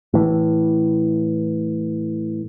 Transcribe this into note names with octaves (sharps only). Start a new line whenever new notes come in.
A2 E3